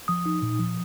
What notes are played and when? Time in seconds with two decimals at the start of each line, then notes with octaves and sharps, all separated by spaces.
0.08 F3 D#6
0.26 D#4
0.42 A#2
0.59 F3